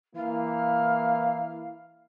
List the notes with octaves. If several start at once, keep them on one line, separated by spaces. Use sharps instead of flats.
E3 A#3 E4 F5